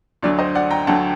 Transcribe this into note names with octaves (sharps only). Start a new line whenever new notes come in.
D2 D3 F#3 D5
C5 D#5
D5 F#5
G5 A#5
D2 D3 F#3 F#5 A5